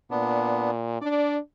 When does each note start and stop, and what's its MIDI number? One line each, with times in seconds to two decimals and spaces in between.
0.11 0.99 46
0.11 0.71 59
0.11 0.71 62
1.01 1.38 62
1.01 1.36 74